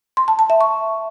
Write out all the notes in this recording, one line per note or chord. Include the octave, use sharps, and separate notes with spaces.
C6
A5
A5
E5
C#6